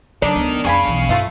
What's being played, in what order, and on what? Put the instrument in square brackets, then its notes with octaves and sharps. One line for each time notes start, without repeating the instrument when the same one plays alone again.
[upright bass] C#3 F#3 [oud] D4 [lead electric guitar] D#4 A#4
[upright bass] C#2 B3
[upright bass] F2 G3 [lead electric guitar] C#4 F5 [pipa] G#4 G#5 B5
[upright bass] B1 E3
[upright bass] G2 [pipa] A3 F4 A4